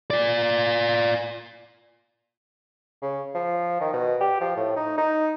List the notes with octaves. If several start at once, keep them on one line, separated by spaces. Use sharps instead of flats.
F4 D5
C#3
F3
D#3
B2
G4
F3
A2
D#4
D#4